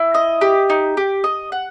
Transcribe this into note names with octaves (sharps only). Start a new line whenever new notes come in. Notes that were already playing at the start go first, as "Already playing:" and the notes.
Already playing: E4
D#5
G4
D#4
G4
D#5
F#5